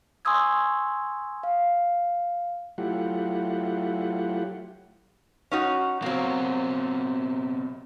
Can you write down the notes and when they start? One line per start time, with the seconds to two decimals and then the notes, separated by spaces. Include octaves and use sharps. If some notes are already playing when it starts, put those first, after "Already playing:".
0.25 G#5 C6 C#6 D#6 E6 G#6
1.43 F5
2.78 F#3 A3 E4 F4 G4 F#5
5.51 C#4 D#4 F#4
6.02 B2 F#3 A#3 C4